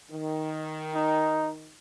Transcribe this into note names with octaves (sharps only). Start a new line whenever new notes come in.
D#3
D#4